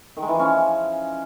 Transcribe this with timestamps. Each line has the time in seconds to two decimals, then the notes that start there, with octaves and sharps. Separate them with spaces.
0.17 D#3
0.22 G#3
0.28 E3
0.34 F3
0.39 C#4